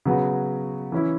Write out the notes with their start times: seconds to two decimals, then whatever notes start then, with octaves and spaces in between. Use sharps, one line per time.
0.05 C#3 F#3 B3 F#4
0.92 E3 C#4 E4